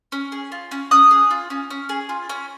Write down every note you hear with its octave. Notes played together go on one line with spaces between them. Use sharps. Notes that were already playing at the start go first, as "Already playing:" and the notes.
C#4
G#4
F4
C#4
C#4 D#6 F#6
G#4
F4
C#4
C#4
G#4
F4
C#4